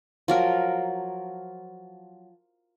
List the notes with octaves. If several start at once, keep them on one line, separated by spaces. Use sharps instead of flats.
F3 F#3 A#4